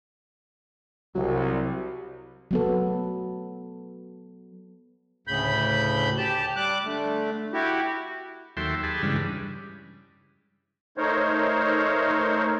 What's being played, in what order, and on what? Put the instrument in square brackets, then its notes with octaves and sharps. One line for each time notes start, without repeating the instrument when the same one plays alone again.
[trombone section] C2 [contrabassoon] F#3
[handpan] F#3 B3 A4
[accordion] D2 A2 C#3 B5 G6
G4 A5
G3 D6 F#6
D3 A3
E4 F#4 G4
[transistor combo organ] D#2 F#3 A4 E5 G5 C6
G4 G#4 A5 B5
G2 C#3 E3 G3 G#3
[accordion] A3 D#4 A#4 C5 C#5